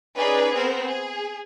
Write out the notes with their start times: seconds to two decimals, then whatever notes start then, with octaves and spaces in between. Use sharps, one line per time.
0.16 C#4 D#4 G#4 B4 D5
0.53 B3 C4 A#4 C5
0.85 G#4